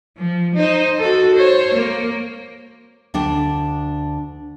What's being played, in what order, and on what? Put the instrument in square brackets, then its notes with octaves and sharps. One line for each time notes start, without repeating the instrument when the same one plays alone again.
[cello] F3
D#4 C5
F#4 A4
C5 C#5
A#3
[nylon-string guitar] D2 D4 G5